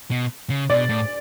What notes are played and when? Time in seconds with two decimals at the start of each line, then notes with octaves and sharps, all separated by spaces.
0.11 B2
0.50 C#3
0.70 B2 D5
0.89 A2